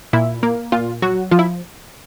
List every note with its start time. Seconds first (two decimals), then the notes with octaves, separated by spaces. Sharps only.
0.13 A#2 E4
0.43 A#3
0.72 A#2 F4
1.02 F#3 F#4
1.31 F3 F4
1.39 E4